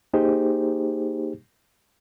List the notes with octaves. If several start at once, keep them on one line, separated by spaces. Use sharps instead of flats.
A#3 D#4 G4 G#4 C5